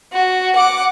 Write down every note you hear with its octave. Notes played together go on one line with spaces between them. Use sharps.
F#4
F#5 D6